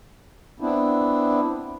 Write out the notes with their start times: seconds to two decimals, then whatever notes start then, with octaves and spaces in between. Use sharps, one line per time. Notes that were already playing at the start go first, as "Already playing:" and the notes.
0.60 B3 C4 D4 E4